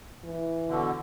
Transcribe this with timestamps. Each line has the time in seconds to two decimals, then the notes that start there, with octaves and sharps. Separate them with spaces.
0.24 E3
0.68 B2 D3